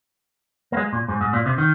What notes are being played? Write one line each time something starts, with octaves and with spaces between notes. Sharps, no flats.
A#3
G#3
A#2
G#2
G#2
A#2
C3
D#3